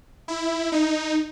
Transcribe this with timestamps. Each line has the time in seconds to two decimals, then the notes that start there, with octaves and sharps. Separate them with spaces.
0.28 E4
0.72 D#4